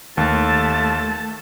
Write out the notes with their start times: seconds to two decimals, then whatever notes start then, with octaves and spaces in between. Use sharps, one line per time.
0.17 D#2 A3 A5